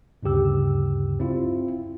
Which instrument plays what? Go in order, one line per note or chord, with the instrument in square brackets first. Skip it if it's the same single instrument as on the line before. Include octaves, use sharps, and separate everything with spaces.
[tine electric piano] D2 G2 C#3 G4 E6
C4 E4 F4